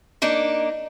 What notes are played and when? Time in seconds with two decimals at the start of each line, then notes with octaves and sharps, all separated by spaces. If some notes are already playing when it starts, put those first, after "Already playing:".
0.22 A#3 D4 D#4